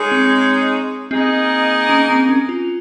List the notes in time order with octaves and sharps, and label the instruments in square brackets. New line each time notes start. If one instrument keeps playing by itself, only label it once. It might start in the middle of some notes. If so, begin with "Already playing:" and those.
Already playing: [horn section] G#3 D#4 G#4 C#5
[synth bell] C4
[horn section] A#3 D#4 G#4 D#5 [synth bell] C4
[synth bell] C#4
C4
C#4
F4